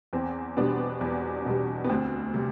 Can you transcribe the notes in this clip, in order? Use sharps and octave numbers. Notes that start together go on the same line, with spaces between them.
E2 C4
B2 G3 B3 D4
E2
B2 G3
B3
D2 C4
C3 G3